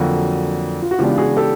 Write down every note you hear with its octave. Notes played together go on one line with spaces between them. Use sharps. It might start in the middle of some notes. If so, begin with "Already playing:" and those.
Already playing: F2 D3 F#3 A#3 F#4
F4
F#4
C#3 E3 G#3 B3 D4 F4 G4
F#4 G#4
G4 A4